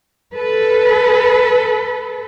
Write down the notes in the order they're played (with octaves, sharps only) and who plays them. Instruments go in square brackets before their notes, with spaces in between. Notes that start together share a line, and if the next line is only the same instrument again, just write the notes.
[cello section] A4 B4